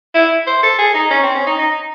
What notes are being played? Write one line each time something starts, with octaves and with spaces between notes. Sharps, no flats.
E4
C5
A4
G#4
D#4
C#4
C4
C#4
D#4
D#4